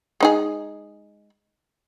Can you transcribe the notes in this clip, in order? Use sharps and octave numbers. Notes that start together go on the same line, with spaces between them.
G#3 D#4 G#4